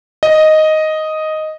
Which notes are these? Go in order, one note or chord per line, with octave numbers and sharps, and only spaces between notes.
D#5